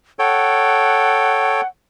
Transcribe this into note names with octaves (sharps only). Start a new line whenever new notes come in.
A4 C#5 F#5 G5